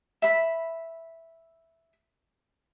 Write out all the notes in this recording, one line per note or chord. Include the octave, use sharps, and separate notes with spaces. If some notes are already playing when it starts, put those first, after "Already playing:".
E5 B5